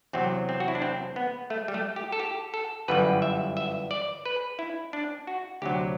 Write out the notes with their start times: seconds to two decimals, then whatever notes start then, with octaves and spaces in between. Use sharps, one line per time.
0.13 E2 C3 F#3 C4
0.49 C4
0.60 F#4
0.68 E4
0.75 D4
0.82 C4
1.16 B3
1.50 A3
1.68 G3
1.74 A3
1.96 G4
2.12 A4
2.20 G4
2.54 A4
2.88 G1 F#2 E3 G3 B4
3.22 E5
3.57 E5
3.91 D5
4.26 B4
4.59 E4
4.93 D4
5.27 F#4
5.62 D2 C3 F#3 G4